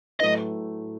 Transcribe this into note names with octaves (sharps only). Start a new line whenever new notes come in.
A2 F#3 A3 E4 B4 D#5